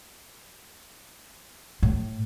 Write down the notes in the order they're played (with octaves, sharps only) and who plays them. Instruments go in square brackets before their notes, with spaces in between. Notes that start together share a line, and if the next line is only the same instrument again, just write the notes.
[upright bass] A2